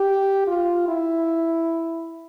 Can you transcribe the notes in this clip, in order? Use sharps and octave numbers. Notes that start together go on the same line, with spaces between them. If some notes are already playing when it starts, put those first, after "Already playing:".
Already playing: G4
F4
E4